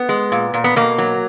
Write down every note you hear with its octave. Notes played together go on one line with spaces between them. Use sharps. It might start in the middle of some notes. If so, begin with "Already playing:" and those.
Already playing: B3
G#3
A#2
A#2
B3
B2 A#3
F#3